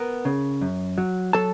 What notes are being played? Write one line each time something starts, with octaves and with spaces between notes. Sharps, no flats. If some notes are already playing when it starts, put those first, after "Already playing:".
Already playing: B3 A#4
C#3
F#2
F#3
F#3 A4 A5